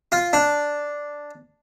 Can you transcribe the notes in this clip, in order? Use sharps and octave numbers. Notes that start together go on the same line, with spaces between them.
F4
D4